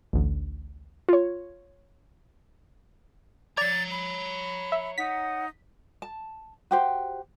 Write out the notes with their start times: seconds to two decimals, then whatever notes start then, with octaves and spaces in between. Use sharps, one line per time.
0.13 A1 D2
1.09 F4 C#5
3.57 C#5 D5 A#5 G#6 A6
3.91 B5
4.72 E5
4.98 D#4 F#5 B6
6.02 A5
6.71 F#4 G4 C5